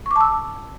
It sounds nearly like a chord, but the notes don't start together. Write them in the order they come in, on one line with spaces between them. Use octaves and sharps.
C#6 D6 A5 E6